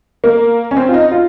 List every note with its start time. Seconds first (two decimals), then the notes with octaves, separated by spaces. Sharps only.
0.24 A#3
0.71 C#4
0.77 C4
0.89 F4
0.94 D#4
1.12 F4